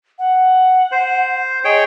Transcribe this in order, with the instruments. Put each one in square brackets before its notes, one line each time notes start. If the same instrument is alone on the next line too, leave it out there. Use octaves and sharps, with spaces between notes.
[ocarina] F#5
[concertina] C5
[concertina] G#4 C#5 G5 [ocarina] D#5